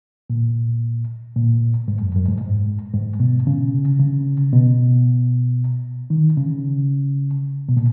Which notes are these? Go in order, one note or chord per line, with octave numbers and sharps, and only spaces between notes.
A#2
A#2
G#2
F#2
F#2
G#2
G#2
G#2
B2
C#3
C#3
B2
D#3
C#3
B2
A#2